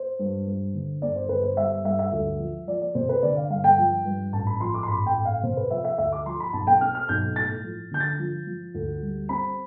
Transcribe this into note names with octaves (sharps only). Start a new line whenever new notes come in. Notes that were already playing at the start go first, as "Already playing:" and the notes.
Already playing: C5
G2
G2
D3
G1 D5
C5
G1 B4
C5
G3 E5
G2 E5
E5
D2
F3
F3 D5
D5
C3 C5
B4
D3 D5
F5
G2 F5
G5
F3
G2
A1 A5
B5
F3 C6
D6
C6
A1 B5
G5
A1
F5
C3 C5
B4
F3 E5
E5
D2 E5
D6
F3 C6
B5
B1 A5
G5
C4 F6
F6
B1 G6
A2 A6
F3
D3 G6
A6
F3
F3
D2
G3
C4 B5